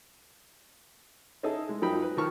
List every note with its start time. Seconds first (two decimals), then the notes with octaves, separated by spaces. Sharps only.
1.43 C#4 D#4 E4 G#4 A4 D#5
1.69 G#3
1.82 F#2 F3 F#3 D#4 G5 B5
2.02 B4
2.17 D#3 F3 A5 C#6 F6